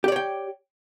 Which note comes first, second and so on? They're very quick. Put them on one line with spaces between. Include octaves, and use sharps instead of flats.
G4 D5 C#5 G5